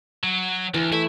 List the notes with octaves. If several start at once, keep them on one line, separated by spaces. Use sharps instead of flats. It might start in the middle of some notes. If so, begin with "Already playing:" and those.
F#3
D2 E3
A3 E4